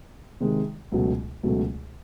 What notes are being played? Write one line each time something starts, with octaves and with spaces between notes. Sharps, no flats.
C3 D#3 G#3
C#2 B2 F#3 A3
C#2 B2 F#3 A3